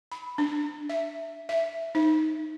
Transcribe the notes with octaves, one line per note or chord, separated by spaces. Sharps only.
B5
D4
E5
E5
D#4